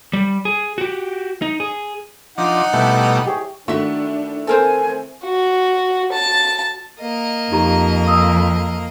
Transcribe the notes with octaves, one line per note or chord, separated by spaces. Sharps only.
G3
G#4
F#4 G4
D#4
G#4
F3 D4 D#4 F#5
B2 G3 A3 E4
G4 G#4 C#5
D#3 A3 D4 E4 F#4 E5
C4 A4 A#4 C5 G#5
F#4
A5
A#3 D#5
F2 D#4 G4 A#5
D#6 E6